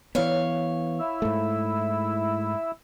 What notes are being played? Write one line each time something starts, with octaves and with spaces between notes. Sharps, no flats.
E3 B3 C#5 F5
E4 E6
G#2 A3